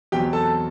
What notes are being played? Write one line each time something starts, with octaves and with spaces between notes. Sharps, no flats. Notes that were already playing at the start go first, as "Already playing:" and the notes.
E2 B2 F#3 C4 G4 G5
A4 A5